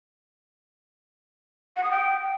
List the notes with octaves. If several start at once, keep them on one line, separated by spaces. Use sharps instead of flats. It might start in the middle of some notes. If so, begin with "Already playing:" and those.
F#5
D#6
G5